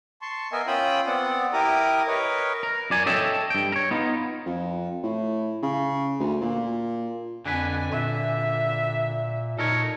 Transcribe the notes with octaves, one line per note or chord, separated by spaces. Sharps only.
A5 C6 C#6
B3 A#4 D#5 E5 G#5
C#4 F4 G5 B5 D#6 E6
B3 C4 D5 F#5
E4 G4 A#4 A#5 D6 D#6
A#4 B4 C#5 D#5
A#4
F#2 D5 G#5
A4 C#5 D#5 E5 G5 A5
G2 G5
A#4 C#5
B3 D#4 F4
F2
A2
C#3
D2
A#2
F2 D3 B4 G#5
A#2 E5
A#2 D#4 A4 A#4 C#5